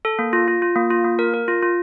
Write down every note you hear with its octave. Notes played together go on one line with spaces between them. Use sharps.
A4
A#3
F4
F4
F4
A#3
F4
A#3
A#4
A#4
F4
F4